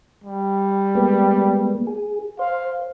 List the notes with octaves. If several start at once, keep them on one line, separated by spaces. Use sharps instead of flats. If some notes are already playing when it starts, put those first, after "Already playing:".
G3
G#3 A#3 B3
G#4
C5 F5